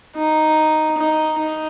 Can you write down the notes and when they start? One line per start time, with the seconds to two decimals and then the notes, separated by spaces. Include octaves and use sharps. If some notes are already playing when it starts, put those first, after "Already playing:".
0.16 D#4
0.97 D#4
1.39 D#4